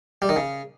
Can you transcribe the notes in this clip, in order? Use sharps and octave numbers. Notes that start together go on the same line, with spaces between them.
G3
D#3
C#3